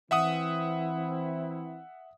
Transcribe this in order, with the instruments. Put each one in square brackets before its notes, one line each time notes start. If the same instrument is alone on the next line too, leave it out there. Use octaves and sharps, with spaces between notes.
[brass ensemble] E3 C4 E4 [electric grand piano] E5 F#5 D#6